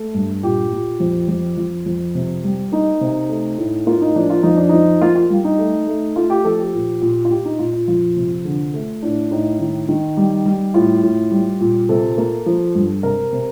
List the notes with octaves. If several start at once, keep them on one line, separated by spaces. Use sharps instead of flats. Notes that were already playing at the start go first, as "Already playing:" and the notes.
Already playing: A3
G2
A#2 G4
A#2
F2
F2
F2 F4
F2
C3
G3
A#3 D#4
C3
A3
A2
A#3 F4
D#4
F3 D4
F4
F2 D#4
D4
F3 D#4
A#3 F4
F4
G3
D#4
A3
A3
A3 F4
G4
F3 A4
G4
A#2
A#2
F4
A#2 G4
D#4
A#2 F4
F4
F2 F4
C3
D3
A3
A2 D4
A2 D#4
D#3
D#3
G3
G3
A2 F4
A2
G3
A#2
C3 A4
A#3
F3
G2
C3 A#4
C3